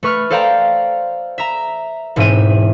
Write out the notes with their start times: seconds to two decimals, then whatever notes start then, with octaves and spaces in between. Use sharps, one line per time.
0.03 A3 B4 C#6 F6
0.30 A4 C5 D5 F5 G5 A#5
1.38 E5 A#5
2.16 E1 G#2 C4 E5 D#7